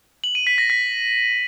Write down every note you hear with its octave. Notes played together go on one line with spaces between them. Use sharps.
F#7
D#7
B6
A#6
B6